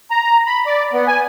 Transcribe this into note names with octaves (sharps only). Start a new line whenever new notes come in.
A#5
B5
D5
B3
G#5